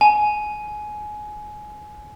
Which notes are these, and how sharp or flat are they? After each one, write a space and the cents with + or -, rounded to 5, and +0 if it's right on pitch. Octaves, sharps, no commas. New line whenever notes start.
G#5 +20